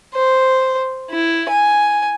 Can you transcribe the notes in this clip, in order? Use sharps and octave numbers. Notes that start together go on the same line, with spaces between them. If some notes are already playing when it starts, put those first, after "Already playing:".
C5
E4
G#5